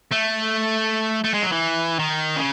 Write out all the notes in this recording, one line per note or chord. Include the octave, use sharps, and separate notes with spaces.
A3
A3
G#3
F#3
E3
D#3
C#3